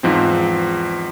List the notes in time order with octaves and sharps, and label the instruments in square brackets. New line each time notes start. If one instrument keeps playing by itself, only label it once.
[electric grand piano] E2 G#2 F3 C4